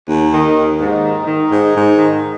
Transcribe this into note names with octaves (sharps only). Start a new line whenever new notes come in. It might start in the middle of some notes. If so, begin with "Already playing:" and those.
D#2
D#3
D#2
G#2 D#4
D#3
D#3
G#2
G#2
D#3